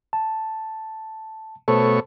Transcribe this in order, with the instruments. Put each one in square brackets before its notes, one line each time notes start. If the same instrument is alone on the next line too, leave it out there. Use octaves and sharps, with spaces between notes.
[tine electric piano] A5
[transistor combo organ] B2 A3 C#5 [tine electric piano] A4 C5 A5